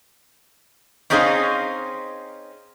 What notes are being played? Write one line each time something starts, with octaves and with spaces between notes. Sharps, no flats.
C4 C#4 D#4 G#4 C5 F5